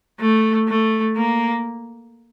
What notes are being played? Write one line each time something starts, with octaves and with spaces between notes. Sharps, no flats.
A3
A3
A#3